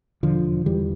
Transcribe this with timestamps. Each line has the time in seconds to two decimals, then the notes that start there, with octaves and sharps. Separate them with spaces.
0.23 E1 D3 F3
0.45 E1
0.65 E2 E3 G3